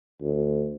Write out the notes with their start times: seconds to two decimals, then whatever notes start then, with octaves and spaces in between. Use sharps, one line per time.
0.22 D2